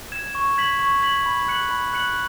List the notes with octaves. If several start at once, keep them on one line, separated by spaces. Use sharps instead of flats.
G#6 E7
C#6
G#6 B6 F#7
C#6
G#6 B6 F#7
B5
F#6 C#7 F#7
B5
F#6 C#7 F#7